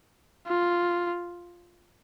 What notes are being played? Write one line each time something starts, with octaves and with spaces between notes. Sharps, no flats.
F4